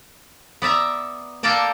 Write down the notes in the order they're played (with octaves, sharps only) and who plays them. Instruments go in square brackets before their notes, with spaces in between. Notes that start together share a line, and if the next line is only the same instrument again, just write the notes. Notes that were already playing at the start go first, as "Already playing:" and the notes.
[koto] B3 D5 E5 A#5
A#3 A4 A#4 D5 G5 A5